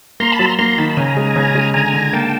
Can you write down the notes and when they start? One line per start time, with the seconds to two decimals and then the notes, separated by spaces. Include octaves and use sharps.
0.20 A#3 A#5 C6
0.32 A5 B5
0.39 F#3
0.46 A#5 C6
0.59 A#3 A#5 C6
0.78 D#3 A5 B5
0.89 A5
0.97 C#3 G#5 A#5
1.17 G#3
1.36 C#3
1.55 G#3
1.74 D3 G#5 A#5
1.93 D3
2.13 A#3 G5 A5